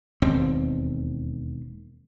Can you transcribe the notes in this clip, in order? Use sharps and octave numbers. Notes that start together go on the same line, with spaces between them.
E1 D#2 C4